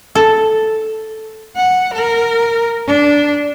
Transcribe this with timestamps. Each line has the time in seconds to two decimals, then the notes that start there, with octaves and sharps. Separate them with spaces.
0.15 A4
1.56 F#5
1.94 A#4
2.87 D4